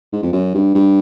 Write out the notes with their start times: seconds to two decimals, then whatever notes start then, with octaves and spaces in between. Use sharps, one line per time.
0.13 G#2
0.23 F2
0.33 F#2
0.55 G2
0.75 G2